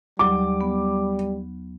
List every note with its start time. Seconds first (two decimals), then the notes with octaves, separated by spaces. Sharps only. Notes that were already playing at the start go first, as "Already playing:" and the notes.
0.19 D#2 F#3 G3 D6
0.61 B3